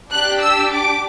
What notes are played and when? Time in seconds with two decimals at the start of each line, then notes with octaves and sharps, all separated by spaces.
0.11 D4 G4 F#6
0.41 E6
0.72 D6